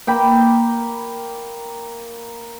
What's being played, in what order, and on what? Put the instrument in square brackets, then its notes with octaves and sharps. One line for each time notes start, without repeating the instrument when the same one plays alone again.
[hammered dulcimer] A#3 G5 B5